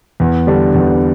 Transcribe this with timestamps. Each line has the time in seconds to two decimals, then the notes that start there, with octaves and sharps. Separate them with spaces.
0.20 E2
0.47 D3 G3 D4
0.74 E2